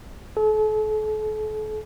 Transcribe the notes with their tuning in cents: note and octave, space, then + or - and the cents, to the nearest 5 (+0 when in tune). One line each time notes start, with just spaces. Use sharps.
A4 -40